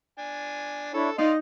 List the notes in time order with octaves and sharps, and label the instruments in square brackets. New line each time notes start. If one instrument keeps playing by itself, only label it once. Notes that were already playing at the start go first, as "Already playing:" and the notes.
[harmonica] D4 G#5
[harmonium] D4 E4 C#5 [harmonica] A4
[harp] D#4 [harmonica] D5 F5 C6 [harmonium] D#5